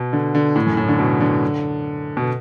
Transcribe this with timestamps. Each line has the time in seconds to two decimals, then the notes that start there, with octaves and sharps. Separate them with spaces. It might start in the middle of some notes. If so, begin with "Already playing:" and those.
Already playing: B2
0.13 D3
0.35 D3
0.56 A2
0.66 F#2
0.77 A2
0.88 D3
0.99 B2
1.21 D3
2.17 B2